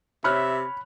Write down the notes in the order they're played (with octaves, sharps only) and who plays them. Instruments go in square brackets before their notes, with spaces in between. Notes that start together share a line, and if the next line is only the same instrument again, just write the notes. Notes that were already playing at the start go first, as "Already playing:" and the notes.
[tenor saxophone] C3 [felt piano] C#5 F6 F#6 [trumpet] E5 [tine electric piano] B5